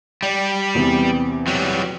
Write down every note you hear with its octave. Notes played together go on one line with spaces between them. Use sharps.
G3 D5
E2 C3 B3
F#3 G3